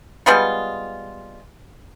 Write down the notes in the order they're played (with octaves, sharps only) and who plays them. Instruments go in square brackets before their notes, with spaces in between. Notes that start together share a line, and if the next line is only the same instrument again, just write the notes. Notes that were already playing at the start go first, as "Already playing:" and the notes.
[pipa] G3 G#3 B3 F4